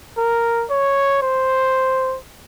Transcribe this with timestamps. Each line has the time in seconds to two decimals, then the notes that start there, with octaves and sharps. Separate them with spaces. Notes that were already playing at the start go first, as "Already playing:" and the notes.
0.18 A#4
0.70 C#5
1.22 C5